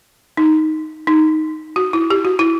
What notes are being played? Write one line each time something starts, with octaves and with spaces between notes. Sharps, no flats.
D#4
D#4
F#4
E4
G4
F#4
E4